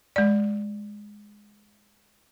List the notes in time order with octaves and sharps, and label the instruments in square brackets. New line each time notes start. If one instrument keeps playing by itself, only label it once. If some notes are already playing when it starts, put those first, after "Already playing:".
[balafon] G#3 D5